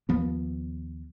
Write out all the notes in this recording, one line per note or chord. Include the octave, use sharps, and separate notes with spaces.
D#2 F3 B3